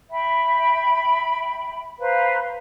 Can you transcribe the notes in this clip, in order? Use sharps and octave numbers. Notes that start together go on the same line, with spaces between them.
E5 G5 B5
B4 C5 F5 A#5